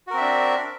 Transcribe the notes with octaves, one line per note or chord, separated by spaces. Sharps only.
C4 D4 F#4 A#4 E5